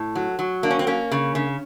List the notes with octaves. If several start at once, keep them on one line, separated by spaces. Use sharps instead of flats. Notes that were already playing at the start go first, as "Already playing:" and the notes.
Already playing: A2
F#3
F#3
A#3 D4
C#4
C4
A#3 C#4
C#3
C#3